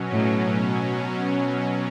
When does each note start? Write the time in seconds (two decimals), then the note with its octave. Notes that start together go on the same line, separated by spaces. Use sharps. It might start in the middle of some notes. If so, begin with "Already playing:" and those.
Already playing: B2 F#3 C#4
0.12 A2